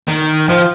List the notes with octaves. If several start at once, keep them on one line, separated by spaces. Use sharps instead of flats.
D#3
F3